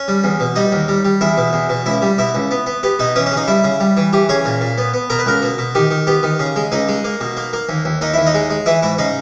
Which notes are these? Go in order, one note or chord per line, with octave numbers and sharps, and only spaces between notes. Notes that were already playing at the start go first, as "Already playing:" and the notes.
Already playing: C#4
G3
E2
B2
G3 D#4
D#2
G3
G3
E2 E4
B2
E2
B2
C#2 E4
G3
B2 E4
C#2
B3
B3
B3 G4
B2 D#4
E3 C#4
C#4
C#3
D#4
G3 E4
C#3
G3
E3
E3 G4
C#3 C#5
A#2
A#2
B3
B3
B2 A#4
B4
C#2 A#4
B2
B2
D#3 G4
D#3
B3 G4
D#3
C#3
G#3
C#2 D#4
G#3
A#3
B2
A#3
A#3
D#2
D#2
D#2 D#4
D#2 E4
D#4
G#3
G#3
E3 E4
G#2 E4
C#3 D#4